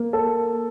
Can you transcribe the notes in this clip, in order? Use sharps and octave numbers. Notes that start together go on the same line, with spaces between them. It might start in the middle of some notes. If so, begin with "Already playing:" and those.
Already playing: A#3
A4